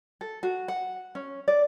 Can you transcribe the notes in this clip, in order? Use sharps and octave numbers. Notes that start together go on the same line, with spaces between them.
A4
F#4
F#5
C#4
D5